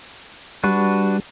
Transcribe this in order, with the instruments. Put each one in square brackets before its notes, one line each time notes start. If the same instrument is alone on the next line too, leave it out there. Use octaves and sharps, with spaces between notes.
[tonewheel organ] G3 [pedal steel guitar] D4 F#4 B4